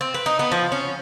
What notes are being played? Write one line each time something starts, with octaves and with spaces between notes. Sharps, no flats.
C4
B4
D#4
B3
F3
C#4